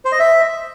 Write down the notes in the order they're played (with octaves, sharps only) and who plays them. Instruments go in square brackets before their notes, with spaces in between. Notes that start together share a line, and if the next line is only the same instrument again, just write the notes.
[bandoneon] C5
D#5
E5